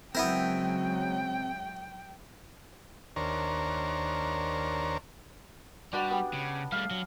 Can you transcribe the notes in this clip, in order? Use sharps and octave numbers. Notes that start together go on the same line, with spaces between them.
C#3 F#3 G#3 B3 C4 E4 A#4 G5
D#2 D4 A#4 C5 C#5 A#5
G3 D4 F#4 B4
B3 G4
C#3
G3 A3 F5
F#3